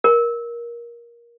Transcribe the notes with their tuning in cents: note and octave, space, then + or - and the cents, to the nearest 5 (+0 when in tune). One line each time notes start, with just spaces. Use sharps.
A#4 +20